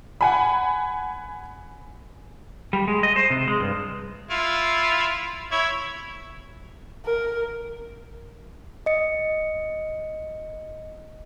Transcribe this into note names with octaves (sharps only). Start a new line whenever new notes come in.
F#5 G#5 B5
G3
G#3
D#5
C5
C3
G#3
G2
E4 F4
E4 C#5
A#4
D#5 C#7